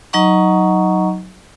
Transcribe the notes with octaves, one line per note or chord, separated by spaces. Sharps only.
F#3 D#4 D#5 F#5 A#5 C#6